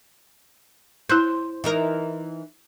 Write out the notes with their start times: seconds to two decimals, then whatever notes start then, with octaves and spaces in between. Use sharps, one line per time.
1.09 E4 C5 F#6 G6
1.64 E3 D#4 A#4